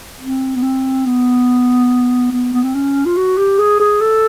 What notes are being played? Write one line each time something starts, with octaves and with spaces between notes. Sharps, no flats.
C4
B3
C4
B3
B3
B3
C4
C#4
F4
F#4
G4
G#4
G#4
A4